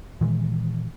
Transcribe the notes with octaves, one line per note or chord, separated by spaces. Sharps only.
A#2 D#3 E3 G#3